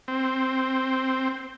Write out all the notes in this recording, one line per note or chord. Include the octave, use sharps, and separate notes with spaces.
C4